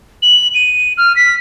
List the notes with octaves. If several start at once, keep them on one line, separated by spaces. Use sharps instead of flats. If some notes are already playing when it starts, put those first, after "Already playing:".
F#7
D#7
F6
B6